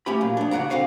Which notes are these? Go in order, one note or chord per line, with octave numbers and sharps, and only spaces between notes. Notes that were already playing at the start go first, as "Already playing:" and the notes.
A3 C#4 G4 B5
A#2 F#3
F2 D4
C#3 F3 F#4 D5 A#5
D3 C4 F#4 F5 G#5